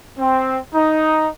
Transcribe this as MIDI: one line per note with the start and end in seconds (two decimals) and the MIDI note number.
0.18 0.58 60
0.74 1.27 63